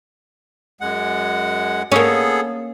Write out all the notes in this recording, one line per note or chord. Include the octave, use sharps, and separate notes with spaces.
F#2 G#3 F#5
A#3 B3 C#4 G#4 A4